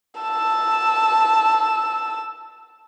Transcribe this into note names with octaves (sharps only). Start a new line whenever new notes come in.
A5 E6